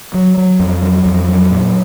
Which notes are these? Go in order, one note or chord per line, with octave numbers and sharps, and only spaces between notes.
F#3
F#3
F2
F#3
F2
F#3
A#2